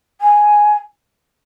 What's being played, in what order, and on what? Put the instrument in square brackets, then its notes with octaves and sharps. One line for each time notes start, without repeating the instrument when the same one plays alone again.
[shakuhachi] G#5